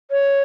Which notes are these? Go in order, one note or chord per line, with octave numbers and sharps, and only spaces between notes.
C#5